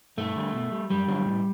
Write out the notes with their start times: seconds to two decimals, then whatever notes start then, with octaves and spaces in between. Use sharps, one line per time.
0.17 G2 A3
0.36 D3 G3
0.53 B2
0.72 G3
0.90 F#2 G3
1.08 D3 F#3
1.25 A2